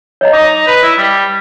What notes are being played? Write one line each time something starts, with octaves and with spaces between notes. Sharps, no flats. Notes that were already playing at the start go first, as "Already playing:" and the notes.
C#5 D#5 A#5
D#4 D6
B4
E4
G3